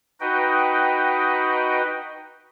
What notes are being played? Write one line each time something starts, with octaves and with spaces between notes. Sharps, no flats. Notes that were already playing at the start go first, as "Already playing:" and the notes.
D#4 F#4 B4 D#5 G5